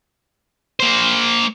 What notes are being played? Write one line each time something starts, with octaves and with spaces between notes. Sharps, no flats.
A#3 C5